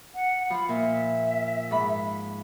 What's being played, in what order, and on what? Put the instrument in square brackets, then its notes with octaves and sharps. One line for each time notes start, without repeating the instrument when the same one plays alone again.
[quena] F#5
[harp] F3 [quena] B5
[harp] A#2 [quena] E5
[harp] G#2 B5